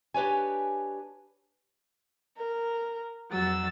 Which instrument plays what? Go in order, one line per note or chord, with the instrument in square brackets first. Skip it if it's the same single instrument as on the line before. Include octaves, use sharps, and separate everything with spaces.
[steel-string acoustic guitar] D4 G4 B4 C#5 G#5
[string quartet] A#4
F2 F#3 E6 A6